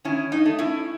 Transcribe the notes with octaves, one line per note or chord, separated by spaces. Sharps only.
D#3 C#4 E4
D#4
A3
C#4 E4